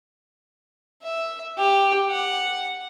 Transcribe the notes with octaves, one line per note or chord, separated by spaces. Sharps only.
E5
G4
F#5